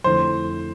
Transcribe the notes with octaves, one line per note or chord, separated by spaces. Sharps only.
F2 D3 A3 E4 C5